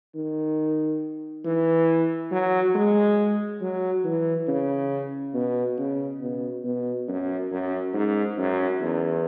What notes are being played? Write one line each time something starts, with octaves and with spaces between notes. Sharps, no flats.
D#3
E3
F#3
G#3
F#3
E3
C#3
B2
C#3
B2
B2
F#2
F#2
G#2
F#2
E2